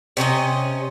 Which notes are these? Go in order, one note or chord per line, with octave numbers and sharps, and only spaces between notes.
C3 C#4 F#4 D#5